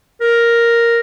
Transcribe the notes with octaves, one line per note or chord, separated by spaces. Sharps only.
A#4